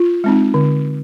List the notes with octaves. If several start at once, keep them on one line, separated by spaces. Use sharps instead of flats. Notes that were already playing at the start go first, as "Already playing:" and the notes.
Already playing: F4
G#3 C4 D#4
D3